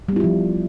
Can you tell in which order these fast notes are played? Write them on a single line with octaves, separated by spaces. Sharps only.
G3 B3 E4 F4 F3